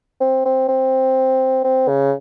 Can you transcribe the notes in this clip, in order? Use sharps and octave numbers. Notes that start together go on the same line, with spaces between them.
C4
C4
C4
C4
C#3